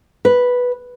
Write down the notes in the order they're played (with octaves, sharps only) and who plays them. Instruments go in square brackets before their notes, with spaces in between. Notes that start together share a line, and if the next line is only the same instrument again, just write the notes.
[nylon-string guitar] B4